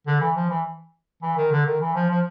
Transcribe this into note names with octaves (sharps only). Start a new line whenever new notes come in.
D3
E3
F3
E3
E3
D#3
D3
D#3
E3
F3
F3